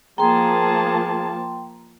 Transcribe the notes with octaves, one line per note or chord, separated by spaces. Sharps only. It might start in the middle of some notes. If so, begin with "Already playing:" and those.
F3 A#3 G#4 G5 A5 A#5 C6